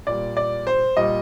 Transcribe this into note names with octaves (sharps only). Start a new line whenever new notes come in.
A#2 G3 D5
D5
C5
A#2 G3 D#5